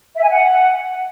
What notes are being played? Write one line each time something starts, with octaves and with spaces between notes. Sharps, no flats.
E5
G#5
F#5